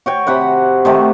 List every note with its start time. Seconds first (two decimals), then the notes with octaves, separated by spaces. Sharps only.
0.06 F#4 C#5 G5
0.27 C3 F#5 B5
0.85 C3 D#3 A3